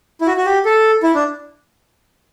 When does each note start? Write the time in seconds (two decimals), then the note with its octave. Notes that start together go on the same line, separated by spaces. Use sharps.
0.21 E4
0.27 F#4
0.37 F#4
0.45 G4
0.65 A4
1.03 E4
1.15 D4